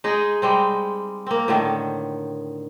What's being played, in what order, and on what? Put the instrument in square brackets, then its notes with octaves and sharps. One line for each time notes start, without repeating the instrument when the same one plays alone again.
[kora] G#3 D#4 G#4
G3 G#3 C4
A#3 C4
A2 D3 D#3